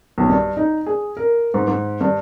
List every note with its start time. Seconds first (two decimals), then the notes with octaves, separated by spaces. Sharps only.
0.18 B1
0.29 G2
0.57 D#4
0.86 G#4
1.17 A#4
1.54 G#2
1.68 G#2
2.01 G2